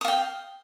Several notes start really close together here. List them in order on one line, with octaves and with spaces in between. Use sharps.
D#6 F5 G5